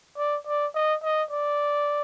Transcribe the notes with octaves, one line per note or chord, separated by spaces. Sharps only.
D5
D5
D#5
D#5
D5